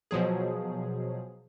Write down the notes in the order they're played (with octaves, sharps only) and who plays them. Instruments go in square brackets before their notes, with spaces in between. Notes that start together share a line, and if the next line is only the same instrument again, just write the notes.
[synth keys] B2 F3 F#3 G#4